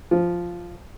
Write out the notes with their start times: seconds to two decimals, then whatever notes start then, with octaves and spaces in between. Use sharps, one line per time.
0.11 F3